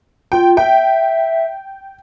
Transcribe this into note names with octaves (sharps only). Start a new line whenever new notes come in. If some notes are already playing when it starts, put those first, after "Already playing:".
F4 G5
E5 G5